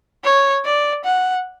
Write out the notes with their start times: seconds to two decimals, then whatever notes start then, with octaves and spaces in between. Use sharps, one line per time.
0.24 C#5
0.65 D5
1.05 F#5